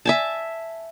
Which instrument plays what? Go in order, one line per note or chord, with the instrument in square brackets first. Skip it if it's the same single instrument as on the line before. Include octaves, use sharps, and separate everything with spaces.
[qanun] E5 G#5 A5